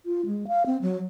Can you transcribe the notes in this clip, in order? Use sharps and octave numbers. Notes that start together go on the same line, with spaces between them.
F4
G#3
F5
C4
F#3